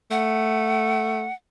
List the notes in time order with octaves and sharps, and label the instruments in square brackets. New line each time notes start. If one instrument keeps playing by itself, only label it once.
[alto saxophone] A3 [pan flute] F#5